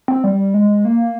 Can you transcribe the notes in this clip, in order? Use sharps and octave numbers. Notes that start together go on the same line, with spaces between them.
C4
G3
G#3
A#3